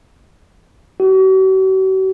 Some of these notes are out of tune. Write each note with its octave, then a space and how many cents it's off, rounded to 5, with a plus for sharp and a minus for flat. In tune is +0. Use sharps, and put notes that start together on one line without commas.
F#4 +45